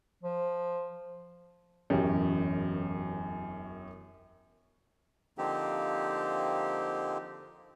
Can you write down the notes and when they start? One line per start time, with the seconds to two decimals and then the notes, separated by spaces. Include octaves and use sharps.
0.23 F3
1.90 E1 A1 F#2 C#4 G4
5.38 D3 F3 A#3 C4 D#4 G4